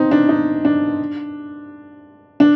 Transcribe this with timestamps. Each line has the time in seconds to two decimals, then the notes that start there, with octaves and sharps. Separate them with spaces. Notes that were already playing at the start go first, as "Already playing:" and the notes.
Already playing: C4 D#4
0.11 D4
0.29 D#4
0.65 D4
2.40 D4